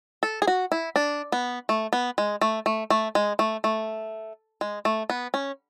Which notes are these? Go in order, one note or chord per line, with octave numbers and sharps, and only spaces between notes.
A4
G#4
F#4
E4
D4
B3
A3
B3
G#3
A3
A3
A3
G#3
A3
A3
G#3
A3
B3
C#4